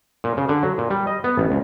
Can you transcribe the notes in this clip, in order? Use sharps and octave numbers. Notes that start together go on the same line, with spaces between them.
A#2
C#3
D3
F#3
A#2
G3
D#5
B3
A1
C#2